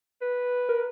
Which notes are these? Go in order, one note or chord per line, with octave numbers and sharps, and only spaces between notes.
B4
A#4